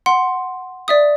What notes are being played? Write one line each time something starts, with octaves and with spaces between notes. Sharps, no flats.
F#5 C6
D5 E5 D#6